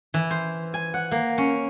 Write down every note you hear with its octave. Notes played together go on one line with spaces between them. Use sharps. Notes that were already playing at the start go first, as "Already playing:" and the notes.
E3
C5
G#5
F#5
A#3
C#4